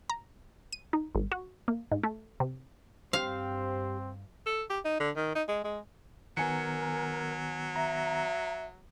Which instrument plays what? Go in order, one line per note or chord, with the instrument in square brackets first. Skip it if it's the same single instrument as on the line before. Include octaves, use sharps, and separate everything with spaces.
[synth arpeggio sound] A#5
D#7
D#4
G#1
F#4
A#3
G#2
A3
C3
[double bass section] G2 [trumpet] C4 [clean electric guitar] G4 C5 [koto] F5
[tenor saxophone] A4
G4
D#4
D3
D#3
D#4
G#3
G#3
[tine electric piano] D#3 B3 [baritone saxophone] F#3 [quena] A#4 [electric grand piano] G#5 C#7
[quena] E5 [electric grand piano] A#5